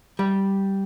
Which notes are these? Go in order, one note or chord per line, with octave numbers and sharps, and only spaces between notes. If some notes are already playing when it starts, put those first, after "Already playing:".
G3